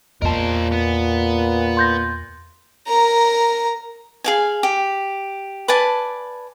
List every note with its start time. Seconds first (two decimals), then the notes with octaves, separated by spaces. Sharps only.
0.22 E2 A#2 G#3 A#4 C5 D#5 A5
0.72 B3
1.77 C6 G6 A#6
2.87 A#4 A#5
4.24 G#4 F5 G#5
4.63 G4
5.68 B4 D5 G#5 A5